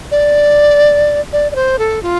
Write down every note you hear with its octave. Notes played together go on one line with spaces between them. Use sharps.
D5
D5
D5
C5
A4
F4